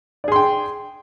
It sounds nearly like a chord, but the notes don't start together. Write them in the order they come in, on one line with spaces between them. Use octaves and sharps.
D5 G#4 C6 G5